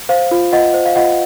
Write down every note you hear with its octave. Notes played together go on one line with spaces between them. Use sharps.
C5 F5
F4
F4 D#5 F#5
C5
F5
F4 D#5 F#5